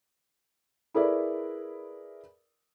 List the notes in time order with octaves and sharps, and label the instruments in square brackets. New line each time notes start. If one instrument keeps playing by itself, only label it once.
[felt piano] E4 G#4 A#4 B4 D5 E5